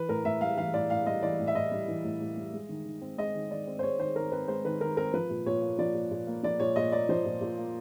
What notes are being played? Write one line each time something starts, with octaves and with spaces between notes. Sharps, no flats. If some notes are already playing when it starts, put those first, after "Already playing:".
Already playing: E3 B4
A2 A#4
A2 E5
G3 F5
E3 F5
A2 D5
A2 F5
G3 D#5
E3 D5
A2
E5
A2 D#5
G3
E3
A2
A2
G3
G#3
D#3
D#3
C4
G#3 D#5
D#3
D#3 D5
C4
C5
G#3 C#5
D#3 C5
D#3 A#4
C4 B4
G#3 C5
D#3 B4
D#3 A#4
C4 A#4
F3 B4
A#2
A#2 C#5
A#3
F3 D5
A#2
A#2
A#3
F3 D5
A#2 C#5
A#2 D#5
A#3 D5
F3 C5
A#2
A#2
A#3